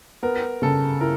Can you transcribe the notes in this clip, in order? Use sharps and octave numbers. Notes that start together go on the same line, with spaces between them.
B3 A#4
C#3 A4
E4 A#4